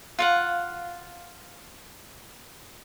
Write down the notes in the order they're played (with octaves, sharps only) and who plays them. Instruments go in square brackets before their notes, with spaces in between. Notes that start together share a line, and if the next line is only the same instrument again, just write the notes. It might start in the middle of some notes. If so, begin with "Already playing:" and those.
[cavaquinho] F4 F5 F#5